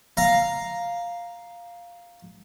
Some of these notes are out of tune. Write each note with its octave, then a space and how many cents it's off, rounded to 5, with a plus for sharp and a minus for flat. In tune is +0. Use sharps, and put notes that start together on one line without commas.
F5 +0 A#5 +0